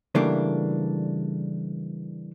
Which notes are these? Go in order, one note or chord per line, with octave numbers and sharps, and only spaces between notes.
C#3 E3 G3 A3 A#3 D4